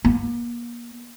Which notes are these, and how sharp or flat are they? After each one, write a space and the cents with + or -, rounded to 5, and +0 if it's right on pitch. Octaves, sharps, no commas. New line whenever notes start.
A#3 +35